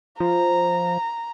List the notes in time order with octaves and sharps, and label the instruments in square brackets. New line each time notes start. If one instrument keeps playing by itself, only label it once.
[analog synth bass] F3 [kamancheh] A#5